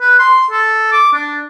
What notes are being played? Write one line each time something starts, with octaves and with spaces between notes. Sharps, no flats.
B4
C6
A4
D6
D4